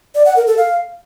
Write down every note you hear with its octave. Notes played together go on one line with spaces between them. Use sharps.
D5
F#5
A#4
A4
F5